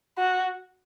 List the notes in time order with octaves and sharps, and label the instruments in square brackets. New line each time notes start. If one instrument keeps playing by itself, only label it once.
[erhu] F#4